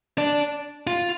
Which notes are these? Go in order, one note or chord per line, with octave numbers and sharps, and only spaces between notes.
D4
F4